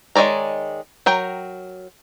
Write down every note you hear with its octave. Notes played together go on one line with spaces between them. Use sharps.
D#3 G#3 C#5 D5 A#5
F#3 A#4 G5